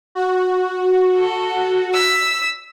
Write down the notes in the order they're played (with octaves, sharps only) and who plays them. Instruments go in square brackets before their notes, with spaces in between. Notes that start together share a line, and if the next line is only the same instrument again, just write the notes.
[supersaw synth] F#4
[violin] A4
E6 B6